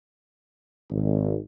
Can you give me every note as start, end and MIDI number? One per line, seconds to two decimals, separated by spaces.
0.91 1.37 32